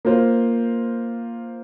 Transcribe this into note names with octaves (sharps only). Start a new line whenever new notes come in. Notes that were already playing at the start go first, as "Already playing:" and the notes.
A#3 F4 C5